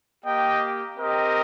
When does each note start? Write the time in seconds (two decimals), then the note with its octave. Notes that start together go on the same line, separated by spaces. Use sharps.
0.24 A#3 G4 D#5 G5
0.98 C4 G4 A#4 D#5